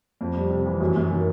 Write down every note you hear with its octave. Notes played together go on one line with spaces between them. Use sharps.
F2
G3
C3
E3
F#2
F#2
D#3